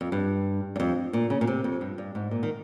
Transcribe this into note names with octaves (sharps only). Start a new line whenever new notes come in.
F2
G2
G2
F2
A#2
C#3
A#2
C3
F2
G2
G2
G#2
A#2
D#3